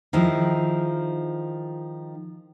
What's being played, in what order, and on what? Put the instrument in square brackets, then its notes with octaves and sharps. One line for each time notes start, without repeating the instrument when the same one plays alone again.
[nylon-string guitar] D#3 F3 G#3 E4